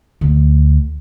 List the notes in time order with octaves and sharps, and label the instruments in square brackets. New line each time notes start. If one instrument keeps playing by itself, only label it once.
[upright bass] D2